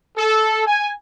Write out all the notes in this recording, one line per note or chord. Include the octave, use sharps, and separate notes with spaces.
A4
G#5